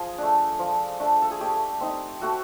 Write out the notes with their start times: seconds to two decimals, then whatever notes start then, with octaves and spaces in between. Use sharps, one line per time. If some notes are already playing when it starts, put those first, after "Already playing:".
Already playing: F3 G#4
0.18 A3 D4
0.59 F3
1.00 A3 D4
1.22 A4
1.31 G#4
1.40 A3 G4
1.81 C4 D#4
2.21 A3 F#4